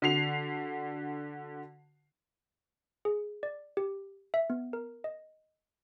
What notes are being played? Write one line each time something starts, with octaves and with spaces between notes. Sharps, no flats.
D3 F#4 C7 F7
G#4
D5
G4
E5
B3
A#4
D#5